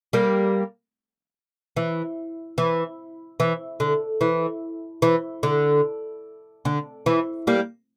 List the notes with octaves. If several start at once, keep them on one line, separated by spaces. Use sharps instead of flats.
G3 A#3
E3
E3
E3
D3
E3
E3
D3
D3
E3
G3 A#3